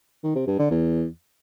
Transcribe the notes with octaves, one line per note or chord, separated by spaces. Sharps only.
D#3
C3
G2
D3
E2